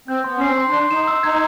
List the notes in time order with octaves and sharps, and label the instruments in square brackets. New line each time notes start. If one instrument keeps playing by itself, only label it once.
[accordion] C4 [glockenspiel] G6
[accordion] B3 [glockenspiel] C6
[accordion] C#4 [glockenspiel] C7
[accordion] C4
[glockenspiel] C6
[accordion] D4
[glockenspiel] C6
[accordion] D#4 [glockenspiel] E7
[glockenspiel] E6
[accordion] D#4 [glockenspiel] G#6